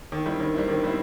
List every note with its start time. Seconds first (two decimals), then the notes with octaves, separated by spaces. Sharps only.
0.12 D#3
0.26 G3 C4 E4
0.40 D#3
0.54 G3 C4 E4
0.69 D#3
0.83 G3 C4 E4